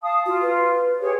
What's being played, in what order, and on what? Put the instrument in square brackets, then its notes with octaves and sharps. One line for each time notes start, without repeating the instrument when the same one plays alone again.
[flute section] F5 A5 D#6
[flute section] F4 [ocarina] F#4
[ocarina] B4
[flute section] G4 G#4 C#5